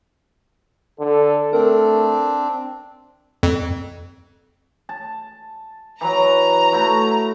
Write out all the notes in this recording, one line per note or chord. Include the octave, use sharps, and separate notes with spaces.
D3 A4
A3 C4 D4 A#4
F2
A5
E3 F#3 A#5
A3 E4 F#4